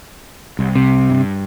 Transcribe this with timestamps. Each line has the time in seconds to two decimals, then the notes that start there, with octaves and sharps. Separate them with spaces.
0.59 C2
0.75 C3
1.10 G2